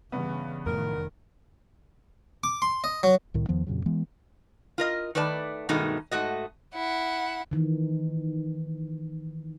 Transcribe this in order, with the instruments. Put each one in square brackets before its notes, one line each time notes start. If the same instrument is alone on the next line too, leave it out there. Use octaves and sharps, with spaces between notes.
[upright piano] G2 B3 [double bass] C#3 E3
[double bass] F1 D#3 [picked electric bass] F2 A2 [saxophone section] A#4
[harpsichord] D6
C6
D#5
F#3
[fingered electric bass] C2 A2 D#3
E2 D#3 F3 B3
F2 A#2 C#3 F#3
E3 G#3 B3
[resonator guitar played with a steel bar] F4 A#4 D#5
D#3 A3 B4 D5 A5
G2 B2 D#3 G#3 A3 D#4
G#2 A3 F#4 D#5
[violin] E4 F#5
[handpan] D#3 E3